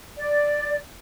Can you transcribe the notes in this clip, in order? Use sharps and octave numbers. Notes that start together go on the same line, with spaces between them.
D5